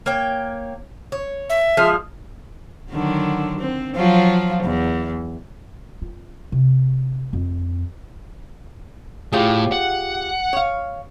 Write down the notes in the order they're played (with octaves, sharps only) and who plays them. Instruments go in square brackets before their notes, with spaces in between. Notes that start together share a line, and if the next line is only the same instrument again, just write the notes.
[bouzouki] A#3 C#5 G5
C#5
[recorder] E5
[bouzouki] F3 G#3 F5
[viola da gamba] D3 D#3 F#3
C4
F3 F#3 F4
E2
[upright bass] F4
C3
F2
[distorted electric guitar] A2 [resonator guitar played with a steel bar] F4 G4 G#4
[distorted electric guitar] F#5
[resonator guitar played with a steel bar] C#5 F5